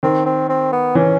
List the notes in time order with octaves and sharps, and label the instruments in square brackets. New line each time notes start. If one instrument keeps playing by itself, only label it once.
[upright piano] D#3 [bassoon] C4
[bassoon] C4
C4
B3
[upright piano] E3 [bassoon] C#4